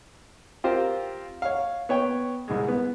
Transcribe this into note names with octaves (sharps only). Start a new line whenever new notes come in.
C4 F4 G4 A#4 C5
C#5 F5
B3 C#5 G5 C#6
C2 G#2 G#3
B3